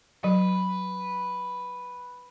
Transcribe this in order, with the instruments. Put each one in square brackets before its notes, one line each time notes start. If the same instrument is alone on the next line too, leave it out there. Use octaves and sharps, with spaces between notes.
[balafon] F#3 [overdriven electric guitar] B4